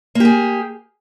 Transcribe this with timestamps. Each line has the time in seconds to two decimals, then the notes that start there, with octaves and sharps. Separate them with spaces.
0.15 A#3
0.20 G4
0.25 G#4